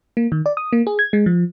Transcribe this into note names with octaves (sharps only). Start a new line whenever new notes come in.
A#3
D#3
D5
D#6
A#3
G#4
G#6
G#3
F3